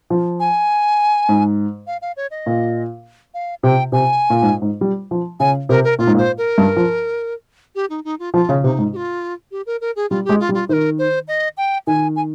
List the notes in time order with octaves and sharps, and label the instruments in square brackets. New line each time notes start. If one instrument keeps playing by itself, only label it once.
[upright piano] F3
[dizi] G#5
[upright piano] G#2
[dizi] F5
F5
C#5
D#5
[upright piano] A#2
[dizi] F5
[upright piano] C3 [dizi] G5
[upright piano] C3 [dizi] G#5
[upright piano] A#2
G#2
G#2
G3
F3
[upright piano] C#3 [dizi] G#5
[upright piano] C3 [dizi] A#4
[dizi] A#4
[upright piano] A#2 [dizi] F4
[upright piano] G#2
A#2
[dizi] C5
A#4
[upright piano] G2
F3
[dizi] G4
D#4
D#4
F4
[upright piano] F3 [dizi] F4
[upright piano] C#3
[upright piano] C3 [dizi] D#4
[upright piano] G#2
[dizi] G4
F4
G4
A#4
A#4
G#4
[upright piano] G3 [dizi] F4
[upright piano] G#3 [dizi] G4
[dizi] F4
[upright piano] G3
[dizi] F4
[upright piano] D#3 [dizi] C5
[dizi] A#4
C5
D#5
G5
[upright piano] D#3 [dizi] G#5
[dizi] G#5